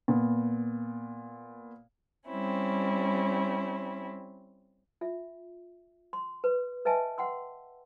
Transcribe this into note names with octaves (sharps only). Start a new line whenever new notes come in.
A#2 B3
G3 C4 C#4 E4
F4 E5
C6
B4
B4 D#5 E5 G#5 A5
F#5 G5 C6 E6